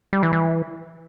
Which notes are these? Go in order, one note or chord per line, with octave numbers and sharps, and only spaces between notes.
G3
E3
E3